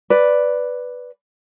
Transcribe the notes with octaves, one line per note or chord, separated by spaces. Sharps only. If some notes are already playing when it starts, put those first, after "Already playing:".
B4 D5